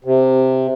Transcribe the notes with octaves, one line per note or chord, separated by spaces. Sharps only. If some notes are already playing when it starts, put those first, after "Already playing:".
C3